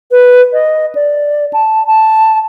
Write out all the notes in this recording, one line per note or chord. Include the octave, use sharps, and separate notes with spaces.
B4
D#5
D5
A5
A5